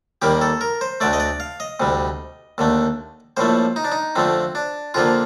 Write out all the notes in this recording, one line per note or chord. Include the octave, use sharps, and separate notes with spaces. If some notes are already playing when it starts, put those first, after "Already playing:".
D#2 D#3 G3 A#3 G4
A4
A#4
C5
D2 D3 A3 D5
D#5
D5
F5
D#5
D2 C3 G3
D#2 D3 A3
A#1 A2 F3 A3 C5
D#4
D4
D#4
F2 D3 F3 A3 C4
D4
F2 D3 F3 A#3 F4